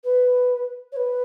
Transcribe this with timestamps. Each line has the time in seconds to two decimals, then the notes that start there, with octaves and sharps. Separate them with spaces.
0.04 B4
0.92 C#5
0.96 B4